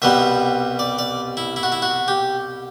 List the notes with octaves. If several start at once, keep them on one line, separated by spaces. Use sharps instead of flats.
C2 B2 G3 B3 E5
D5
D5
E4
E4
F#4
E4
F#4
G4